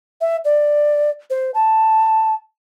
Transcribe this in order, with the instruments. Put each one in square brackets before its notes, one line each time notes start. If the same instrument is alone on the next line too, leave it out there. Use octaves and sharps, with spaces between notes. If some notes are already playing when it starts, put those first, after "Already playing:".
[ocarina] E5
D5
C5
A5